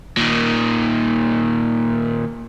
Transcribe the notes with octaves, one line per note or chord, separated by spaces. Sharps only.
A#2 D#3